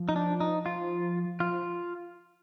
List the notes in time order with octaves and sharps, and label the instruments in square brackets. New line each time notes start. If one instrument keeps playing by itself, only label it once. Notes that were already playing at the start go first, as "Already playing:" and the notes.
Already playing: [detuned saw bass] F3
[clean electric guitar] D#4
D4
D#4
F4
[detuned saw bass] F3 [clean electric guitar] F4